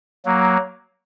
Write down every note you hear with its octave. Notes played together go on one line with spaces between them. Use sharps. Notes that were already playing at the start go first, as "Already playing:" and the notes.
F#3 A#3